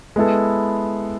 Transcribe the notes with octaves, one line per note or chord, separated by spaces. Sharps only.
G#3 B3 E4 A4